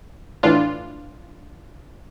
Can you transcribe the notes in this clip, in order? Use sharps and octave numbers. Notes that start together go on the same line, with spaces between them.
A2 E3 D4 F4